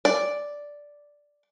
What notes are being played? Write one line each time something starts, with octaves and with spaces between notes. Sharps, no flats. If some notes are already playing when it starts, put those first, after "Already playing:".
D5